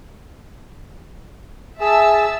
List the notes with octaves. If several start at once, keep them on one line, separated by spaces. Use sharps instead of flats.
G#4 E5 A5 E6